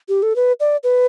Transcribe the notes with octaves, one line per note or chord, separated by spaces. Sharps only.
G4
A4
B4
D5
B4